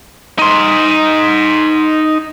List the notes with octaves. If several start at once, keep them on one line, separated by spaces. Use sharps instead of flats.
D#4 C6